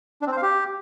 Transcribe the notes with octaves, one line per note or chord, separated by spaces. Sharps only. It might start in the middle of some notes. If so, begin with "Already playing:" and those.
D4
C4
C5
F5
G4